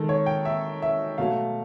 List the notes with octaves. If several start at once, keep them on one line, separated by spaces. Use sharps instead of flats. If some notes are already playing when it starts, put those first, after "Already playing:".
Already playing: D#3 G#3 A4
C#5
G5
E5
E5
B2 F#3 A3 F5